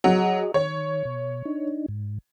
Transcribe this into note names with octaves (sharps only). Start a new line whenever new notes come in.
F#3 F#4 G#4 D#5
D#3 C#5
B2
D4 D#4
G#2